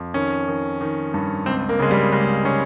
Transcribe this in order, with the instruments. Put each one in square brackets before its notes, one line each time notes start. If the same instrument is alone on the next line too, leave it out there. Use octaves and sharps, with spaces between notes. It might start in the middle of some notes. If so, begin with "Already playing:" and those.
Already playing: [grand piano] F2
D#3 C#4
D#3
D#3
G2
C#2 C4
A#3
C#3 G#3
G3
C#2 G#3
C#3 C#4